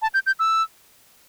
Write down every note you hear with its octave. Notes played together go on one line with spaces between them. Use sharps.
A5
G6
G6
E6